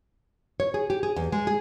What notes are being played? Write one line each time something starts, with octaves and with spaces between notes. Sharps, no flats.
C#5
G#4
G4
G#4
E2
G#3
G#4